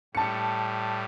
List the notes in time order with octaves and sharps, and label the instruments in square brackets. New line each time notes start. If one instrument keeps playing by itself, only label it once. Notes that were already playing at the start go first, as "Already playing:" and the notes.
[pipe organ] A2 G3 [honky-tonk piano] A5 C#7